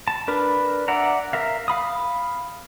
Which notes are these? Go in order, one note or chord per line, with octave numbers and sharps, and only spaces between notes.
A5
D4 A#4 B4
D5 E5 F#5 A#5
A#4 E5 F5
F5 B5 D#6